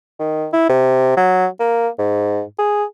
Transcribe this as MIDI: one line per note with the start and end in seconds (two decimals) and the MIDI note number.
0.19 0.48 51
0.53 0.67 64
0.69 1.17 48
1.17 1.47 54
1.60 1.88 58
1.99 2.42 44
2.59 2.84 68